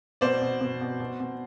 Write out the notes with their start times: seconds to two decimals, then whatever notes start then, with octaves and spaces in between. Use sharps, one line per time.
0.21 B2 C5 D5
0.41 B2
0.61 B2
0.81 B2
1.00 B2
1.20 B2